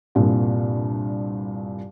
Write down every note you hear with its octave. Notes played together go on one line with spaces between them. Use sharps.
C2 G2 A#2